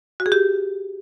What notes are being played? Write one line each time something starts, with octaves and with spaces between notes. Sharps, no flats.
F#4
G#4
G4